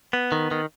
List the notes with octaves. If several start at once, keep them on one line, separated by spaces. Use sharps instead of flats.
B3
D#3
D#3